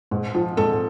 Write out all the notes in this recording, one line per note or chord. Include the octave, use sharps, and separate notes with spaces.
G#2
F3
G#2 A4